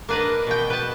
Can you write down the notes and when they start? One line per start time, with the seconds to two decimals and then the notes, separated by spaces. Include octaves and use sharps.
0.09 A#3 D4 B4 D5 D#5
0.46 B2 G5
0.70 B4 A5